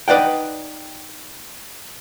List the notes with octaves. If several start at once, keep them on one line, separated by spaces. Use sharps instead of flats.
D#4 B4 D5 F#5 G5